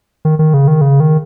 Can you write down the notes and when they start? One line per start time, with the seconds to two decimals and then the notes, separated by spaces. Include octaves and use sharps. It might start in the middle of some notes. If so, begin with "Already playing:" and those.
0.25 D#3
0.39 D#3
0.54 C#3
0.68 D#3
0.81 C#3
1.00 D#3